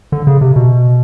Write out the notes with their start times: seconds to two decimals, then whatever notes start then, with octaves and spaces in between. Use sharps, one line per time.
0.12 D3
0.27 C#3
0.41 C3
0.56 B2